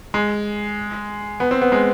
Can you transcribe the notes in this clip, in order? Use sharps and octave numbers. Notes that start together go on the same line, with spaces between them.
G#3
B3
C4
B3
G#3